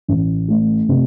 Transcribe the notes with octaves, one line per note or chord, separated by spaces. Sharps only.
A1
A3
C3